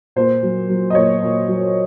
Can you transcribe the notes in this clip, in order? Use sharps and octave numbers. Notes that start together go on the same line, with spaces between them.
A#2 C5
F#3
F#3
D#5
A#2 C#5
A#2
F#3